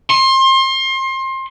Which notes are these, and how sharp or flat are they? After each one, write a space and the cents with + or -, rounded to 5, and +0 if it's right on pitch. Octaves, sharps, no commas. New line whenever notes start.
C6 +30